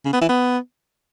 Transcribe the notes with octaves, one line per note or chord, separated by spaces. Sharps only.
C#3
B3
E3
B3